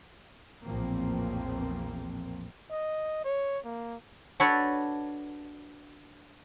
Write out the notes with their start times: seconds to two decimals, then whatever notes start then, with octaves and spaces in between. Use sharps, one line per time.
0.65 A#1 E2 A2 F3 A#3 C4
2.71 D#5
3.24 C#5
3.64 A#3
4.40 D4 F#4 A4 B4 C#5 D5